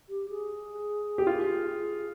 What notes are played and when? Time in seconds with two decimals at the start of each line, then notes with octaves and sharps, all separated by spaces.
0.09 G4
0.29 G#4
1.18 G4
1.27 F4